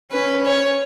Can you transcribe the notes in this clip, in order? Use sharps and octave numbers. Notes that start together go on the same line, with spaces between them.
C#4 B4
C#5